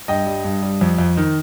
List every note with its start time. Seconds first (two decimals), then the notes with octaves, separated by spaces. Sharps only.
0.08 G2 D#5 G5
0.26 G3
0.45 G2
0.62 G3
0.81 F2
0.99 F2
1.17 D#3